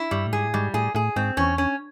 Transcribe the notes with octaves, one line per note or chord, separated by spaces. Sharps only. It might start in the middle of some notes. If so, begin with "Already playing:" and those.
Already playing: E4
G2 G3
A2
G#2 G#4
A2
G#2 G3
A2 G#4
A2 G#4
G#2 C4
E2 C#4
C#4